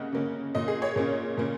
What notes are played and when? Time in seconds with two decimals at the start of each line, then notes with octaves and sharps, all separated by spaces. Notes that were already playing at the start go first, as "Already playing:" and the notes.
Already playing: C#3 A#3 C#4 D#5 F#5
0.13 C#3 A#3 C#4
0.55 A#2 A#3 C#4 D#5
0.68 G#4
0.82 C#5
0.96 A#2 A#3 C#4
1.37 A#2 A#3 C#4